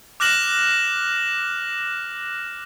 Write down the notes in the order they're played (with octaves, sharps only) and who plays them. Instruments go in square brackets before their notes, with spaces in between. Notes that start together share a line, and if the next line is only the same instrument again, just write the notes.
[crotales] D6 F6 F#6 A#6 E7 F#7